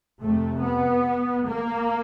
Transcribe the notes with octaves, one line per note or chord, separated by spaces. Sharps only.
F2 C3 A3
B3
A#3